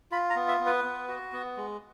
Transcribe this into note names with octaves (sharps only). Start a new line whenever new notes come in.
F4 B5
A#5
B3
E5
B3
B4
B3
F#4
B3
G#3